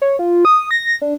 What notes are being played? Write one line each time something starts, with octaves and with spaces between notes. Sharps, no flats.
C#5
F4
D#6
A#6
D4